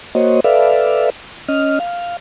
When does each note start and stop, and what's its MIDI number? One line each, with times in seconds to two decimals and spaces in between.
0.15 0.40 58
0.15 0.40 66
0.15 0.40 72
0.15 0.40 73
0.15 0.40 75
0.44 1.10 69
0.44 1.10 71
0.44 1.10 74
0.44 1.10 76
0.44 1.10 77
1.49 1.79 61
1.49 1.79 75
1.49 1.79 89
1.80 2.17 77